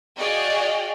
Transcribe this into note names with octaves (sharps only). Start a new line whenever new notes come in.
F#4 G#4 D5 D#5 F5 G5